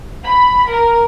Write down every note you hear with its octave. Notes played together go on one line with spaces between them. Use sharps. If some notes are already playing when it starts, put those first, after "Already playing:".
B5
A#4